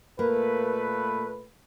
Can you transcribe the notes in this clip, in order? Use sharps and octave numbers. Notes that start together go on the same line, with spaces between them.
A#2 A3 A#3 B4